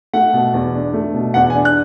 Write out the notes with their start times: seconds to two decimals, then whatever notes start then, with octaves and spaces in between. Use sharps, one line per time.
0.13 A3 F#5
0.33 B2
0.54 E2
0.74 D4
0.94 A3
1.14 B2
1.34 E2 F#5
1.50 G#5
1.55 D4
1.65 F#6